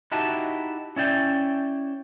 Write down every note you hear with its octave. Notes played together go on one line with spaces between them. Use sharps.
D#4 E4 F#4 G4 A5
C#4 E4 D5 G5